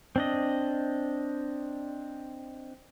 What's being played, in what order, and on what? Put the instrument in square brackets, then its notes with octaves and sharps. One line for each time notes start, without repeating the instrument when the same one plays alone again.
[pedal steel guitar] C4 D4 D#5